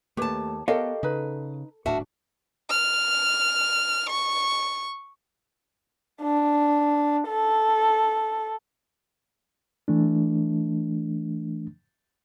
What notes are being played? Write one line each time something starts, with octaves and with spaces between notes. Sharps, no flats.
D#2 A3 G4 B4 C#5 A5
B3 G4 A4 A#4 C#5 D#5 F5
C#3 D#4 B4
D#1 A2 D4 F#4 E5 F5 A5
F6
C#6
D4
A4
E3 A3 D4